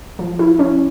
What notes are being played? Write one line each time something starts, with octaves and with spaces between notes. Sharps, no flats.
F3
E4
C#4